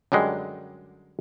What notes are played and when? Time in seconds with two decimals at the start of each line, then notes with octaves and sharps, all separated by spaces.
0.12 F#2 D3 G3 G#3